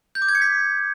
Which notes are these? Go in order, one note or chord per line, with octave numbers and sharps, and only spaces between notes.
G6
D6
G#6
C#7
B6